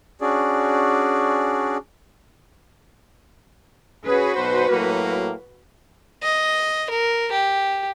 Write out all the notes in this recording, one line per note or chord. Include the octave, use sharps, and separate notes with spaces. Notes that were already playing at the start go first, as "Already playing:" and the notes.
C#4 D4 F#4 G#4 D5
C#4 F#4 G#4 B4
B1 B2 C5
A2 F#3 A#3
D#5
A#4
G4